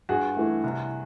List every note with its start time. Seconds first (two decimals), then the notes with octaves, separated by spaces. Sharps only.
0.09 G2 F#4 G#4
0.37 E3 A3
0.64 C2